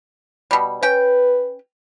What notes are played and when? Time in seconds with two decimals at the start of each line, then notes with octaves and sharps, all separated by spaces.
0.51 B2 G3
0.83 C#4 B4 G5